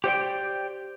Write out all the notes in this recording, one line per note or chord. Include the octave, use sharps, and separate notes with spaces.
G4 C5 D5 G5